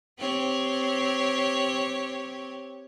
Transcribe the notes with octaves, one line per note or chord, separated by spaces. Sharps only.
C4 G4 C#5